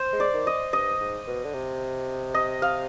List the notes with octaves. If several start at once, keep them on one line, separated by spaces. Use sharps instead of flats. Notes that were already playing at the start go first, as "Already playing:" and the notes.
Already playing: C5
G#3
D5
D#3
D#5
G2 D#5
G#2
B2
D3
C3
D#5
F5